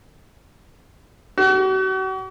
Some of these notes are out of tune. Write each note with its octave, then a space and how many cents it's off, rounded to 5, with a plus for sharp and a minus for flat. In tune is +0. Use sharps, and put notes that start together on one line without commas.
F#4 +40